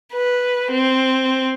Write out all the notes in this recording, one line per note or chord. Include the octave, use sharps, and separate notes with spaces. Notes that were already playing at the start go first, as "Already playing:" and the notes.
B4
C4